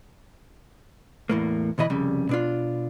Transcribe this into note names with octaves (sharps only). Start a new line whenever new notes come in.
E2 A2 A#3
D2 B2 E3 D#5 B5
C2 F2 C#3 G3
B2 D4 F4